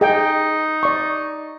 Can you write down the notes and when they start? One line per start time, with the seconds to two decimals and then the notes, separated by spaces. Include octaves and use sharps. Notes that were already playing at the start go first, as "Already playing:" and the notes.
0.01 D#4 G#4 D#5 G5
0.83 D5 C#6